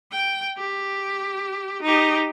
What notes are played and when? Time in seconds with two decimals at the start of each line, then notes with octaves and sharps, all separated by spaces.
0.12 G5
0.58 G4
1.83 D#4 G4